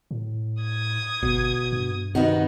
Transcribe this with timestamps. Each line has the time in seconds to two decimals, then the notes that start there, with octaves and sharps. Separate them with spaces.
0.11 A2
0.62 D#6 G#6
1.23 G1 B2
1.72 G2
2.15 C3 D#3 B3 D#4 F#4